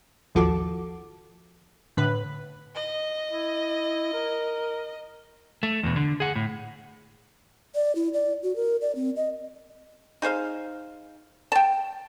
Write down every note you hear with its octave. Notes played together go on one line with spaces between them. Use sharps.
A1 D#2 F3 F#4 A4 D6
A2 D3 B4 B5 F#6
D#5
E4
A#4
A3
E2 B2
D3
G#4 F#5
A2
D5
E4
D5
F#4
A#4
D5
C4
D#5
D#4 G#4 C5 F5
G5 A5